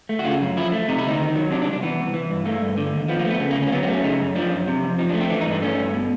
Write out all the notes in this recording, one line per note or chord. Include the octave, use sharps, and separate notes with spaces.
A3
F#4
C#3 F4
F#2
F3 E4
A3
C3 D#4
E4
D2 D#4
D#3
F#3
C3 D4
D4
C2
D4
E3 B3
C2
E3
G2
A3 A#3
G2
D3
D#2
F3 B3
A#3
A3 B3
C#3 A3
A#3
D2
C#4
A#3
F#3 B3
C4
A3
C#4
C#3 D#4
F#2
F3 D4
F#2
C3
F2
F3 D#4
D4
A3
C4
E3 D4
D#4
G2
D4
A3 C#4
G2
B2